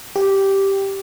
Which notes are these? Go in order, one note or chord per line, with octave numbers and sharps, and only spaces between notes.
G4